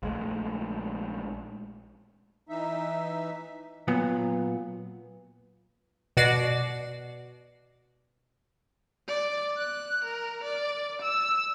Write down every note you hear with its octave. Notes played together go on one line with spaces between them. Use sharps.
A#1 G#3 A3
E3 D#4 E5
A#2 F#3 B3
B2 F#4 D5 A#6 C7
D5
F#6
A#4
D5
E6